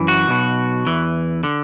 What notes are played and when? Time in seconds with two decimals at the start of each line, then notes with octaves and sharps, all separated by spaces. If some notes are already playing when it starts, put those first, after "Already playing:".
Already playing: F#2 E3
0.08 F#4
0.27 B1 B2
0.86 E2 E3
1.43 D3